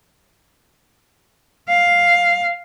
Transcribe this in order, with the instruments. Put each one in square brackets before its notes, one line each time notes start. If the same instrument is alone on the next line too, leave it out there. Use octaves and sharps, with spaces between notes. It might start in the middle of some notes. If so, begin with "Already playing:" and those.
[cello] F5